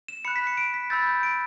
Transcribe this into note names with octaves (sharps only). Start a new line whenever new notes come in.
E7
B5 F#6 C#7
B6
C#7
D7
B6
B5 E6 G6 A6
G6
D7